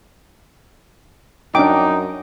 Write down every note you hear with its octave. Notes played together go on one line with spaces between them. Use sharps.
F#2 D4 D#4 G5 D6